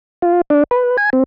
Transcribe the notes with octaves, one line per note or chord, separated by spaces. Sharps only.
F4
D4
B4
G#5
C4